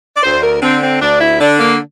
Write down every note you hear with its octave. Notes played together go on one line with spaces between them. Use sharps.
D5
D2 C5
A#4
D3 C4
C4
D2 D4
E4
D3 D4
A#3